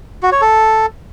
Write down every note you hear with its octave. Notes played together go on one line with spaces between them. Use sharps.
F#4
C#5
A4